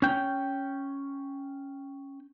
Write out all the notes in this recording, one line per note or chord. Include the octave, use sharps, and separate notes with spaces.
C#4 G5